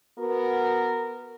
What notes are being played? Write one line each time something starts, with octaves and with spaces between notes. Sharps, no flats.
B3 F#4 A#4